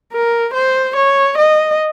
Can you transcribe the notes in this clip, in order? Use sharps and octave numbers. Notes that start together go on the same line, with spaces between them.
A#4
C5
C#5
D#5